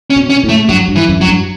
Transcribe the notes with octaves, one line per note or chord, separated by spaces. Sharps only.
C#4
B2
C#4
A2
A3
G2 F#3
G2
E3
F#2
F#2 F#3
G2